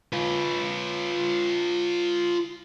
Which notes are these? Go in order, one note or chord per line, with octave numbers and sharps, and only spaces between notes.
F4 B4